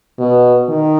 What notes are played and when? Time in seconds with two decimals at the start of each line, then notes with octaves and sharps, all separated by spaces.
0.19 B2
0.69 D#3